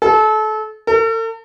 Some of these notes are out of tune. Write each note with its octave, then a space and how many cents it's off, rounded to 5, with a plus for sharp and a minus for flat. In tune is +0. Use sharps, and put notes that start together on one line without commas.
A4 -30
A4 +45